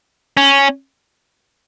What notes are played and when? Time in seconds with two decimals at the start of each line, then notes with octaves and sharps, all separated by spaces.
0.37 C#4